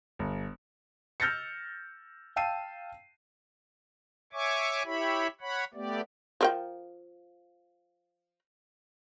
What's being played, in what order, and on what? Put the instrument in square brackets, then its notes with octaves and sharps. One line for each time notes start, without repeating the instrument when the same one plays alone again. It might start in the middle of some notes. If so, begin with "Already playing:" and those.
[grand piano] G1
[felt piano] E6 F6 G6 A6 A#6 C#7
F5 G5 A5 E6 C7 D#7
[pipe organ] C#5 E5 G#5 C#6 D6
E4 G4 C#5 E5 B5
C#5 F#5 B5
A3 B3 G4 D5
[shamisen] F3 A#4 G5